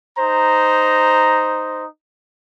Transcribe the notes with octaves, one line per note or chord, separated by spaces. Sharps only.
D#4 C5 A#5